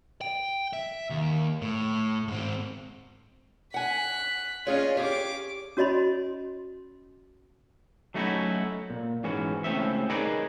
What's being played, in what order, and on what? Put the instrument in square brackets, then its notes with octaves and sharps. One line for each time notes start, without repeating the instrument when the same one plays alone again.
[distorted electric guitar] G5
E5
D#2
A2
G#2 C4
[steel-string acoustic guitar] F#5 G#5 [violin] F#6 B6
[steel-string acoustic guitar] C#4 G#4 C#5 [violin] F4 D#5
[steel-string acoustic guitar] G4 G#4 F5 [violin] C#5 D6
[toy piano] C#4 F#4 C#5 D#5 B5 C6
[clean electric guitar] F#3 A3 C#4 D#4 E4 F#4
A#2
G#2 E3 C#4 F#4
C#2 A2 G#3 C4 C#4 E5
D#4 G#4 A#4 B4 C#5 D5